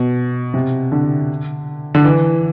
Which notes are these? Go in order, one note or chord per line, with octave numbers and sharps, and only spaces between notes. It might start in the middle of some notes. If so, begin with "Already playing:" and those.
Already playing: B2
C3
D3
D3
E3